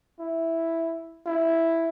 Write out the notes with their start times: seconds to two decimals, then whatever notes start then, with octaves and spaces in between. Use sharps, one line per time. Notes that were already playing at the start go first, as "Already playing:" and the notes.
0.20 E4
1.26 E4